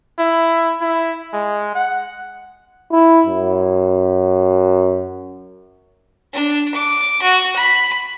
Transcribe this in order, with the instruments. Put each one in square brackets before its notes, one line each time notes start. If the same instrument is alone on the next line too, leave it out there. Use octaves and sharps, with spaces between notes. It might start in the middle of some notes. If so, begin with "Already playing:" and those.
[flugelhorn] E4
E4
G#3
F#5
[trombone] E4
F#2
[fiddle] D4
D6
F#4
B5